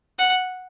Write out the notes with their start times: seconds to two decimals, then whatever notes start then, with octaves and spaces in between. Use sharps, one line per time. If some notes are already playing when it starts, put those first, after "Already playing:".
0.19 F#5